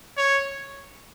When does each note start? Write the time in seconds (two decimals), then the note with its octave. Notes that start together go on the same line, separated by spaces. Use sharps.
0.17 C#5